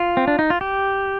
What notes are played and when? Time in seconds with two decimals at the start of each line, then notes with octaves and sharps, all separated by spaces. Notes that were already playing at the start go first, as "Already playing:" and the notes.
Already playing: F4
0.17 C4
0.28 D4
0.39 D#4
0.50 F4
0.61 G4